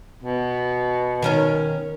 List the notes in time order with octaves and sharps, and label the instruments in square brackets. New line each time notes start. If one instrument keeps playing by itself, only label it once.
[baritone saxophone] B2
[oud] D#3 C#4 A#4